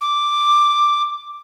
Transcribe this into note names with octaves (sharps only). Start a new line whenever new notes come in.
D6